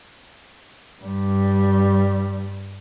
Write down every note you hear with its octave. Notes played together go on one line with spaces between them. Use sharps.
G2 G3